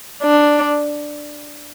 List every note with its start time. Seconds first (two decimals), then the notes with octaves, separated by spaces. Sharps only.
0.23 D4